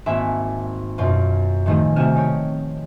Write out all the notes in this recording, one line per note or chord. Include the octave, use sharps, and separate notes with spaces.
G#1 A#3 E5 G#5 B5
F#2 B2 F4
A2 D#3 F3 A3 D#4 G#4
C3 A3 F#4 G#5 F6 E7
D#4 G4 C#5